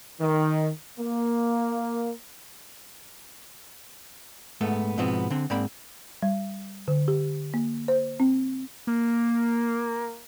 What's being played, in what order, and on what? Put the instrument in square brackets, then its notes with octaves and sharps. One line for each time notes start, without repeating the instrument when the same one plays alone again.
[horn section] D#3
A#3
[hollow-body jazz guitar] G#2 A3 B3
G#2 B2 F3 B3 C4
D3 C4
G#2 A#3 C4 D5 B5
[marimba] G3
D3
G4
A#3
C5
C4
[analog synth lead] A#3